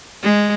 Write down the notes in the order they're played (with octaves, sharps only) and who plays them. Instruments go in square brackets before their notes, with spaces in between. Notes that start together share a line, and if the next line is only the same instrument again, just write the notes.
[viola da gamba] G#3